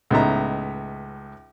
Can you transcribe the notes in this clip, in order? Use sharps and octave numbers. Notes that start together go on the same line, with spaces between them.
C#2 A2 B3 D#4 E5 A#5